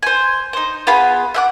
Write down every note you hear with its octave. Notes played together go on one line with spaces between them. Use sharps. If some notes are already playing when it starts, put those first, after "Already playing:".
C5 G#5
D#4 C5
B3 F4 G#4 B5
E5 F#5 D6